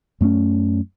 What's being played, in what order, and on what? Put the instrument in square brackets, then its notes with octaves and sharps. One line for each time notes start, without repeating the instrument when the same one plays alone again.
[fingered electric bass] F#2 A3 B3 C#4